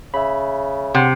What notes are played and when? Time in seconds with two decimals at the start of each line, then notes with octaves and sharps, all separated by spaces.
0.14 C#3 E5 B5
0.95 C3 F#5